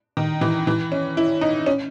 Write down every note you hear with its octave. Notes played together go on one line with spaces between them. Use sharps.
D#3
E3
E3
C#4
E4
D#4
C#4